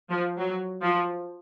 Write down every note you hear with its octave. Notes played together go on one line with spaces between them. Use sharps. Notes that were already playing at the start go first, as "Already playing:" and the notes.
F3
F#3
F3